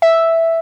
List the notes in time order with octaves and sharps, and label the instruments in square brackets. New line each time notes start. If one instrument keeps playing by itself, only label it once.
[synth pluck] E5